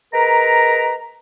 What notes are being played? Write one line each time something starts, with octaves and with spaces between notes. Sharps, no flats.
G#3 A#4 B4 A#5